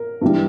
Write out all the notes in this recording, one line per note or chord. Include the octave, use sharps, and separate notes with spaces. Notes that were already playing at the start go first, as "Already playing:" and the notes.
Already playing: A#4
G2 E3 G3